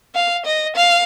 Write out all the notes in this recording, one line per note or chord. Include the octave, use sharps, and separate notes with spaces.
F5
D#5
F5